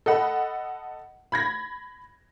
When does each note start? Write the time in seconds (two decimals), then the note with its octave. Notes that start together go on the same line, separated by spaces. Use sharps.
0.06 A4 D#5 F#5 B5
1.32 B5 G#6 A#6